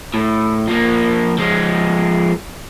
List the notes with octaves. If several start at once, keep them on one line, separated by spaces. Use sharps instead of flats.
A2
F3 A#3
F3 G#3